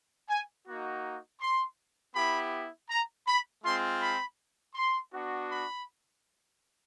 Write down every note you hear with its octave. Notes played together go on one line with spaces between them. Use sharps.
G#5
A#3 D#4 F#4
C6
B3 E4 G4 B5
A#5
B5
G#3 C4 F4 C6
B5
C6
B3 D4 F#4
B5